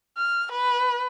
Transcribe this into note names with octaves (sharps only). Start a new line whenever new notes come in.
F6
B4